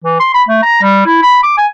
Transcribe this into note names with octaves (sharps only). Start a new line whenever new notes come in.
E3
C6
B5
A3
A#5
G3
E4
B5
D6
G#5